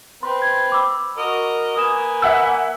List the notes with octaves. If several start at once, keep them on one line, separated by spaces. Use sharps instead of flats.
C4 B4 C6
G#6
B5 D6 E6
F#4 A#4 D#5
A#3 B4 G#5 D#6 E7
E5 F#5 E6